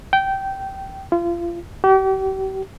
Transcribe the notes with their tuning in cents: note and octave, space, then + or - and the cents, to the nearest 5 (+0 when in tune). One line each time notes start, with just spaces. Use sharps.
G5 -15
F4 -30
G4 -40